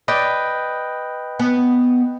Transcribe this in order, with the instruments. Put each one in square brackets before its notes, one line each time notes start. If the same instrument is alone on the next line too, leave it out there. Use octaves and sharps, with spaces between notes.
[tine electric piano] B4 D#5 G5 [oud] D5
[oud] B3